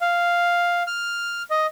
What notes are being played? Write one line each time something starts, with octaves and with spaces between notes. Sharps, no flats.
F5
F6
D#5